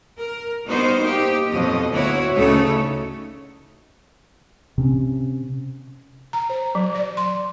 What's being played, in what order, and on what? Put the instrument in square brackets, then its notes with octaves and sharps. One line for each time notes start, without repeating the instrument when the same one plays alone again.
[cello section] A#4
G3 B3 D#4 F#4 A#4 C5
A#3 D#4 G4
F2 B2 F#3 D#5
D2 A#3 E4 F#4 C#5
D2 C#3 A3 D#4 A4 C#5
[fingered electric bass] C3 C4 C#4
[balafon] A#5
C5
F#3
D5
C6